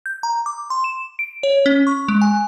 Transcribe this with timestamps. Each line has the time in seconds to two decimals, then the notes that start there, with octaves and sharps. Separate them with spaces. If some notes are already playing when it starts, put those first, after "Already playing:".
0.06 G6
0.23 A#5
0.46 D6
0.70 C6
0.84 E7
1.19 D7
1.43 C#5
1.66 C#4
1.87 C#6
2.08 G#3
2.21 G#5